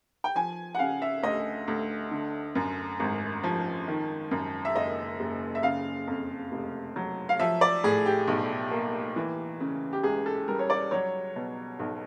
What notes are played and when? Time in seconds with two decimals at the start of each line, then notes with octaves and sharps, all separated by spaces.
0.24 G5
0.35 F3 G#5
0.75 F#5
0.79 C#3 F5
1.02 E5
1.23 D2 D#5
1.68 D2
2.11 D3
2.55 F#2
3.00 G#1
3.44 F3
3.88 D#3
4.31 F#2
4.65 E5
4.76 F#1 D#5
5.20 F#1
5.55 E5
5.63 C#3 F5
6.07 F2
6.52 F1
6.96 F#3
7.29 F5
7.40 F3 E5
7.61 D5
7.84 A2 G#4
8.06 G4
8.28 B1
8.71 A#3
9.16 E3
9.60 C#3
9.93 G4
10.04 C#2 G#4
10.26 A4
10.48 G3 A#4
10.59 C#5
10.70 D5
10.91 F#3 C#5
11.36 B2
11.80 B1